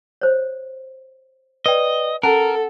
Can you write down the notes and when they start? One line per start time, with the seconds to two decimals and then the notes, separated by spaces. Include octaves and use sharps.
0.21 C5 C#5
1.66 B4 D5 D#5 G5
2.23 C#4 A4 A#4 F#5 A5